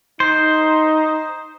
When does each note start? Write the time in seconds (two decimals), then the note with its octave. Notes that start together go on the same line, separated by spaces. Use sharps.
0.20 D#4 C5